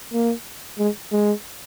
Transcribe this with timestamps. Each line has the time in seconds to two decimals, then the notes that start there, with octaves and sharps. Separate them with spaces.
0.13 A#3
0.78 G#3
1.12 G#3